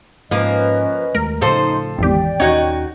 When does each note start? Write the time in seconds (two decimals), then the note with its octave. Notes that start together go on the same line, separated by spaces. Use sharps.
0.31 G#2 F3 A#3 C#4 B4 D#5
1.15 D#2 G#3 A3 A#4
1.41 A2 C#3 F3 D#4 A4 C5 C6
1.98 G#1 E2 G4 D5 G5
2.40 D#2 C#4 D#4 F#4 C#5